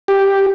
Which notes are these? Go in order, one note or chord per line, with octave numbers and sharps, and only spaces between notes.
G4